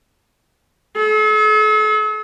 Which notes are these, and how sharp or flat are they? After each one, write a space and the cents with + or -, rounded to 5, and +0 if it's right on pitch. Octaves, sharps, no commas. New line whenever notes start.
A4 -45